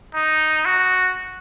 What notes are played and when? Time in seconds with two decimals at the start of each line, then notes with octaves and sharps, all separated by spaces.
0.15 D#4
0.65 F#4